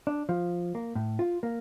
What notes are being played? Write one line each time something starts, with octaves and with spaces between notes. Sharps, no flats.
D4
F3
A#3
A2
F4
A#3